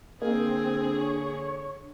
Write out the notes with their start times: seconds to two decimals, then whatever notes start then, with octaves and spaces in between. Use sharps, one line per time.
0.22 D3 A#3 C4 G#4
1.00 C#5